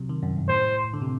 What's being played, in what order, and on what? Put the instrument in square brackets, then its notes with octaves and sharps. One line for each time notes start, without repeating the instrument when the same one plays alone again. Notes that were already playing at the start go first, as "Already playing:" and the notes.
Already playing: [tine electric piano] C3 F#3
D#3
F#2
G2
[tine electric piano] A2 [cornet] C5
[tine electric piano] D3
C3